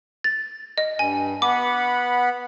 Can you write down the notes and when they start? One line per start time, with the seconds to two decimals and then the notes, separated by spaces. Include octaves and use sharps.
0.24 A6
0.78 D#5
0.99 G2 G#5
1.42 B3 F#5 B5 D6